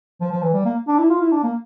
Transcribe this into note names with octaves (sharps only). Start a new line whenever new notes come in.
F3
F3
E3
G3
A#3
D4
E4
F4
E4
D4
A#3